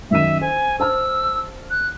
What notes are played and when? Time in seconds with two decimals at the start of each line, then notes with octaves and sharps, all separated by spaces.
0.11 F#2 D#3 E5 D#7
0.41 C5 G#5
0.80 C5 A5 E6 F6
1.71 F#6